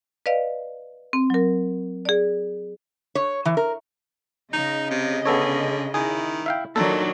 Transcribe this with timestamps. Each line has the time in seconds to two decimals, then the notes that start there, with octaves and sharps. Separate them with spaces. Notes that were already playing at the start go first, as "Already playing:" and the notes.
0.26 B4 D5 D#5 F5
1.13 C4
1.30 F#3 A#4
2.05 G#4 D5
3.15 C#5
3.45 E3
3.57 A#4
4.53 C#3 D#4 D#5
4.91 C3
5.25 D3 B3 C#4 G#4 A4 C#5
5.94 D#3 E4 G#4
6.46 E5 F5 G5
6.76 A#2 D#3 F#3 D4 A4